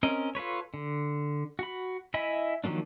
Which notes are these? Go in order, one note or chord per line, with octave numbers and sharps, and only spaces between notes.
C4 C#4 A#4 D#5
F4 A4 B4 C#5
D3
F#4 B5
E4 D#5 E5 G#5 B5
D#3 F3 F#3 A#3 D4